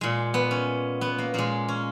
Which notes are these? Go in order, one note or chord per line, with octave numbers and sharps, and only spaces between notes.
A#2 G#3
B3
C#4
B3
A#3
A#2 G#3 A#3
C#4